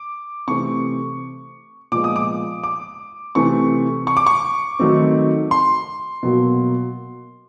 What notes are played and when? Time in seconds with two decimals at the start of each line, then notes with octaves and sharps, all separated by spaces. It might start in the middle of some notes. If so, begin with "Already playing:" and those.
Already playing: D6
0.48 C3 E3 A3 C4 C#6
1.92 A#2 F3 G#3 B3 D6
2.04 D#6
2.16 D6
2.64 D6
3.35 C3 E3 A3 C4 C#6
4.07 C#6
4.17 D6
4.27 C#6
4.79 D#3 F#3 A3 C4
5.51 C6
6.23 B2 F#3 A#3